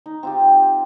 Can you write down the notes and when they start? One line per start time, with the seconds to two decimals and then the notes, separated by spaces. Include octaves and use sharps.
0.06 D#4
0.23 C4 F4 G4